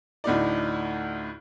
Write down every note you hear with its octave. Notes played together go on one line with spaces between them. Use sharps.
D2 A2 D#4 D5